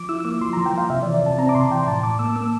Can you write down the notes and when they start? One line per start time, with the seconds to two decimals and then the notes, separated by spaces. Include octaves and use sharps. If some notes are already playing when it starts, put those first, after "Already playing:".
Already playing: F3 D6
0.09 E4 E6
0.20 E6
0.25 A#3 D6
0.41 F3 C6
0.53 F3 A#5
0.66 G5
0.73 F3 F5
0.90 C3 E5
1.02 D5
1.06 E3
1.14 D5
1.23 C3 A5
1.38 C4 A#5
1.49 D6
1.55 C3 C6
1.70 E3 G5
1.87 A2 A5
2.03 A2 D6
2.19 A#3 E6
2.36 A#3 E6